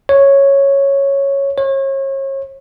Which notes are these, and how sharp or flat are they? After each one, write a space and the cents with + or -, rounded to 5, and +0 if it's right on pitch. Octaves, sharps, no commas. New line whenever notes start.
C#5 -5
C#5 -35